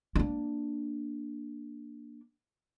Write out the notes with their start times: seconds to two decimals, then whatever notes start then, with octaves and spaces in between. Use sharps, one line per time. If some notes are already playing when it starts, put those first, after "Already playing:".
0.15 A#3 D4